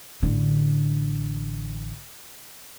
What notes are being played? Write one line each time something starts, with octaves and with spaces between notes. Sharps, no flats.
A1 D3